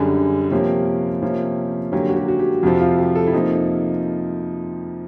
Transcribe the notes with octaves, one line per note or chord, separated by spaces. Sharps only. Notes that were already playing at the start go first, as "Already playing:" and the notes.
Already playing: F#2 D3 G3 G#4
C3 F3 A#3 C#4 G4
C3 F3 A#3 C#4
D3 F#3 A#3 C#4 G4
F#4
G4
F#4
G4
F2 C3 F3 F#4
F4
G4
A4
E4
C3 F3 A#3 D#4